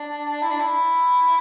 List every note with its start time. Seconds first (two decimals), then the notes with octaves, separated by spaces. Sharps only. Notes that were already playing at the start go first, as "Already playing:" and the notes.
Already playing: D4
0.42 E4
0.51 D4
0.60 E4